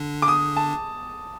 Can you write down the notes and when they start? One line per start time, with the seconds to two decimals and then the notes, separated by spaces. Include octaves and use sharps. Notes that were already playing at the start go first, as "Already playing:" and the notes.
Already playing: D3 D4
0.22 D6
0.28 D#6
0.57 A5